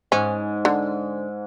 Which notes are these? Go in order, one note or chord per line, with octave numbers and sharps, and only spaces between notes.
G#2 C#4
D3